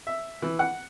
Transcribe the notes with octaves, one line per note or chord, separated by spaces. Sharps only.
E5
E3
F#5